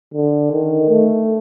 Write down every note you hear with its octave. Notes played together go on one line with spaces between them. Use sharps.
D3
D#3
A3